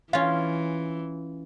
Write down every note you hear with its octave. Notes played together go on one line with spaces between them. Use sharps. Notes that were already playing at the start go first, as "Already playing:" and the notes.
E3 C#4 F4 F5